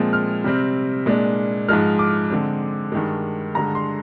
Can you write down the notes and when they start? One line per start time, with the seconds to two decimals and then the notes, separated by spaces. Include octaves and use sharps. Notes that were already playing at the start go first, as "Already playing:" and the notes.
Already playing: A#2 F3 G#3 C4
0.13 F6
0.44 C3 G3 C4
1.06 A#2 G#3 D4
1.69 G#2 F3 G#3 F6
1.99 D6
2.30 D3 G#3 C4
2.92 G2 D#3 G#3
3.55 G2 D3 G#3 A#5
3.75 C6